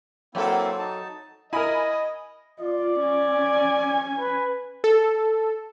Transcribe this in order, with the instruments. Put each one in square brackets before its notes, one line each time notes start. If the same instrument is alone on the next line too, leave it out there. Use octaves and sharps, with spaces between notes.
[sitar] F#3 A4 [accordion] A#3 C4 E4
[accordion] D#4 A5
[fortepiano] E4 A#4 [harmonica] D#5 [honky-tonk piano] G#5 B5
[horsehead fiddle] F4 [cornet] D5
[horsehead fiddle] C#4 G#5
[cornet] B4
[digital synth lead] A4